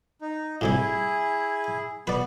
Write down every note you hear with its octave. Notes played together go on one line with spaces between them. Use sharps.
D#4
A2 C3 G3 E4 G#4
B3 B4 D5